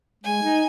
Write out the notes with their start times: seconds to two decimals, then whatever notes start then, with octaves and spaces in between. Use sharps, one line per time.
0.24 G#3 G#5
0.43 D#4